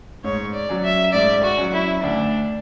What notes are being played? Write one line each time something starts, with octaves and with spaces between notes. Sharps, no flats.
G#2 C#5
D5
F#3 C#4
E5
G#2 D5
F#4
F#3 C#4
E4
D2 D4